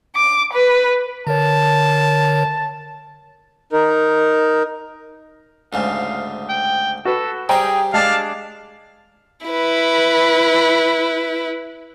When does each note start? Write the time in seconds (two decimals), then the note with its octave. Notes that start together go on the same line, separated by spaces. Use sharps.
0.15 D6
0.54 B4
1.27 D3 A#4 C#5 A5
3.72 D#4 A#4
5.73 D2 G#2 C#3 F5
6.50 G5
7.05 F#4 A4 B4
7.49 G3 G#4 C5 C#5 G5 A#5
7.94 G#3 D4 D5 F5 A5
9.46 E4 B4